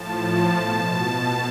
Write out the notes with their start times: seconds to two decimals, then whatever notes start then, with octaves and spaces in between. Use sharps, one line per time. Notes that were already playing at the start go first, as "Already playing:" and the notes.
Already playing: A2 F3 A5
0.56 B2